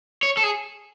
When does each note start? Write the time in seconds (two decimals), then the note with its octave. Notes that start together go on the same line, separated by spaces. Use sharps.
0.23 C#5
0.37 A4
0.43 G#4